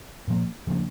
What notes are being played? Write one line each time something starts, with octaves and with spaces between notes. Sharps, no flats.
A#2 F3 A#3
C#3 F3 A#3 D4